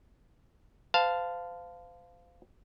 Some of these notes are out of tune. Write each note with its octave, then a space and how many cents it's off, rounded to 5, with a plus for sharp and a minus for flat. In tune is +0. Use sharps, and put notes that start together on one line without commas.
C5 -35 F5 +0 A5 +0